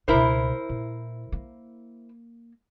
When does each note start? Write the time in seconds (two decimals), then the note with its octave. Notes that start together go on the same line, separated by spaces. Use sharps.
0.08 C#2 B2 E4 A#4 C5
0.69 A#2
1.32 A#3